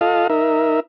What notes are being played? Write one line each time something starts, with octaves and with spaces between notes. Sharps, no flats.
F4 A4 D#5 F5
D#4 A#4 E5